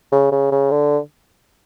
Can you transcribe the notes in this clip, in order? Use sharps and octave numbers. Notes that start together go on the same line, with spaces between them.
C#3
C#3
C#3
D3